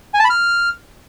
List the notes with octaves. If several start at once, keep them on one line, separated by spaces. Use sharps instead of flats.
G#5
A5
B5
F6